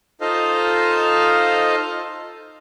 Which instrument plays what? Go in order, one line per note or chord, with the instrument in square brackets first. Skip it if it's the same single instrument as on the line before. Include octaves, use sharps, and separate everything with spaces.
[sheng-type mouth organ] D#4 F4 A4 C5 D#5 F5